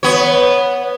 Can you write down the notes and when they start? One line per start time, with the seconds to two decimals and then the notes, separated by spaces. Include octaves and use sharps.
0.03 B3 C#5